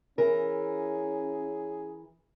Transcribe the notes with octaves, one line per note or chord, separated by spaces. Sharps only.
E3 C#4 G#4 A#4